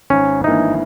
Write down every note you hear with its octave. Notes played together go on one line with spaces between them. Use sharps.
G#1 C#4
G2 E3 A#3 D#4 E4